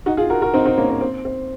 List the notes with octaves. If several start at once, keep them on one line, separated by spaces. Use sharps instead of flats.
D#4 F#4
F4 G#4
F#4 A#4
F#4 A#4
C4 D#4
C4 D#4
A#3 C#4
C4
C4
C4